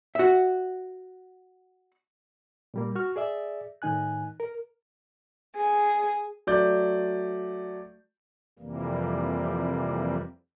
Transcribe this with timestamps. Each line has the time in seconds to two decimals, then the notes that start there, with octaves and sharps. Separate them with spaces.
0.15 F#4 E5
2.74 A#2 G3 A#3
2.95 F#4 C#6 F6
3.16 G#4 D5 E5
3.82 A2 D#3 D#4 G#5 F#6
4.40 A#4
5.55 G#4
6.47 F#3 A3 D5 G6
8.59 F2 C3 E3 G3 A#3